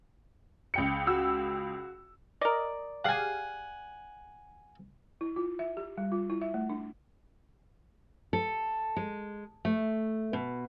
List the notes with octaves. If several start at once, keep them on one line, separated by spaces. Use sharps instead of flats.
C#2 G5 C#7
F#4 E6
A#4 D5 D#5
G4 G#4 F5 F#5 G#5
E4
F4
E5
G4
G3
F4
E4
E5
A3
D4
A4
G#3
A3
B2